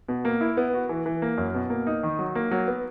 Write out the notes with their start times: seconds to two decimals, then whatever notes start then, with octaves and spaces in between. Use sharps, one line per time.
0.09 B2
0.25 A#3
0.41 E4
0.57 B3
0.73 F#4
0.89 E3
1.06 E3
1.22 A#3
1.38 F#2
1.54 B2
1.70 A#3
1.87 D#4
2.03 D#3
2.19 F#3
2.35 A#3
2.51 F#3
2.67 B3